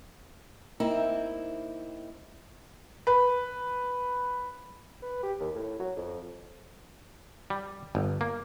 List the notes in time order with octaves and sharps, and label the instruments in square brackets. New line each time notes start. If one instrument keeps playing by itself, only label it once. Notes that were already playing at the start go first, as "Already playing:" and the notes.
[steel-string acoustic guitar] A#3 C4 D#4 E4
[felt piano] B4
[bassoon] B4
G4
D#2
A2
F#3
F2
[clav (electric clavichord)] G3
G1
A#3